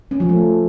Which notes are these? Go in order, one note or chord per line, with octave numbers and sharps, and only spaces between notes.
C#4
F3
A3